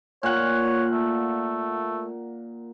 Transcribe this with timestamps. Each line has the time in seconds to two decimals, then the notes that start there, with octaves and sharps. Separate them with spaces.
0.23 A#2 C#5 F#5
0.92 A3